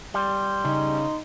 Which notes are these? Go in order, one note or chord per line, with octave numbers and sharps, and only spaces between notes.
G3 C6
C#3 D#4